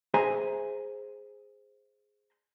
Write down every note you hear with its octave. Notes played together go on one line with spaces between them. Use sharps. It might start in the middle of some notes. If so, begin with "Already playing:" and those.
G#4 C5 E5 G#5 A#5